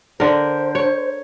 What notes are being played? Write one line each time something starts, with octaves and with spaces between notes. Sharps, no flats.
D3 A#4 C5
C#5